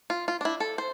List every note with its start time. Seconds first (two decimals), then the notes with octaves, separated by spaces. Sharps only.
0.10 F4
0.28 F4
0.41 D4 E4
0.60 A4
0.78 C5